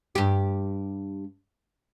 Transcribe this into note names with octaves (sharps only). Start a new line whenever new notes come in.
G2 G4